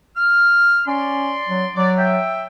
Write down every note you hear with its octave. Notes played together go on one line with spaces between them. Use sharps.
F6
C#4 D5 C6
F#3
F#3 D5
E5 G5